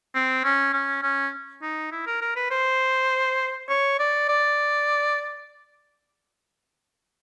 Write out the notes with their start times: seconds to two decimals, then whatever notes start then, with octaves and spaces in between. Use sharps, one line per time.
0.15 C4
0.44 C#4
0.73 C#4
1.03 C#4
1.62 D#4
1.92 E4
2.07 A#4
2.22 A#4
2.36 B4
2.51 C5
3.69 C#5
3.99 D5
4.29 D5